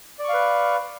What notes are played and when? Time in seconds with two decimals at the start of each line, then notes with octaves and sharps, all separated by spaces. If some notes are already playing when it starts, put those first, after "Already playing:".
0.19 D5
0.24 C#6
0.29 F5
0.33 B4